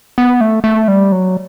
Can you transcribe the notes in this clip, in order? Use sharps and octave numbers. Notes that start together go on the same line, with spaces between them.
B3
A3
A3
G3
F#3